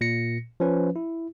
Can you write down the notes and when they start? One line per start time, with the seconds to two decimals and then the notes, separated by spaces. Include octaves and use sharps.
0.01 A#2 A#6 C#7
0.60 F3 C#4 B4
0.96 E4